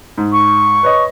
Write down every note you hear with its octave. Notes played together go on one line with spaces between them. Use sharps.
G#2
C#6
B4 C#5 D#5